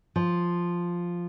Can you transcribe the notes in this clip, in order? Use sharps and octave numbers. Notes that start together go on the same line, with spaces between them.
F3